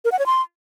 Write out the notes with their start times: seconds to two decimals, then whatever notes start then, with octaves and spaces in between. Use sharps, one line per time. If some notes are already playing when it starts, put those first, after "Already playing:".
0.05 A#4
0.12 F#5
0.19 C#5
0.26 C6